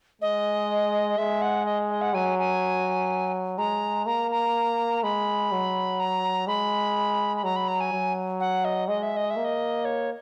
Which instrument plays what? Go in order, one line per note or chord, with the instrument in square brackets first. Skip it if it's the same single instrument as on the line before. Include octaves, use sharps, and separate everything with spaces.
[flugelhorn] G#3 [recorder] D#5
[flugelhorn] G#3 [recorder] E5
[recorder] F#5
D#5
D#5
F#5
[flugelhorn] F#3 [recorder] G#5
[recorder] G#5
[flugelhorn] G#3 [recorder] A#5
[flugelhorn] A#3 [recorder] A#5
[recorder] A#5
[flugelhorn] G#3 [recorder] B5
[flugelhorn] F#3
[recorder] A#5
[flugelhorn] G#3 [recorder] B5
[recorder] B5
[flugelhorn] F#3 [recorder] A#5
[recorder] B5
A#5
G#5
[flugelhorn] F#3
[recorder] F#5
D#5
[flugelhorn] G#3 [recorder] D#5
[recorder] E5
D#5
E5
[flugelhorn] A#3
[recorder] D#5
C#5